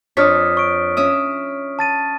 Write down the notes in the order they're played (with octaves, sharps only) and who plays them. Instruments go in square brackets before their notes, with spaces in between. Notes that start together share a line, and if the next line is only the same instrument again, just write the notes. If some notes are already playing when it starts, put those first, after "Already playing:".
[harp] F2 D4 C#5 [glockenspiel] D#6 F6 B6
[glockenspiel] C#6 D7
[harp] C#4 E5 D#6
[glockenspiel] A5 A6 D#7